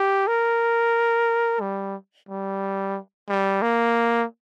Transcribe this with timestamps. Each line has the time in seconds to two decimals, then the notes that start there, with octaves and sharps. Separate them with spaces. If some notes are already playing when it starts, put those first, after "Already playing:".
Already playing: G4
0.28 A#4
1.61 G3
2.29 G3
3.29 G3
3.62 A#3